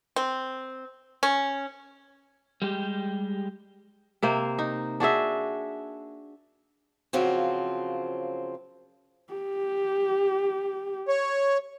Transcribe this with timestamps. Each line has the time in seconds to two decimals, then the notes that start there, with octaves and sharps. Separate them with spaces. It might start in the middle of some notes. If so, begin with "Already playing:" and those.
0.16 C4
1.23 C#4
2.62 G3 G#3 G4
4.22 C3 A#3 C5
4.59 D#4
5.00 D4 F#4 G#4 E5
7.13 C#3 F3 F#3 A#3 C4
9.33 G4
11.08 C#5